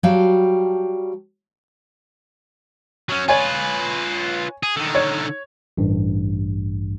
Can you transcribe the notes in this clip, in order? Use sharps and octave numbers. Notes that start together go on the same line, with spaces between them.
F#3 G3 F#4 F5 G5 A5
F#3 C#4
F4 B4 C#5 G#5
G#4
D3 D#3
C#5
A1 G2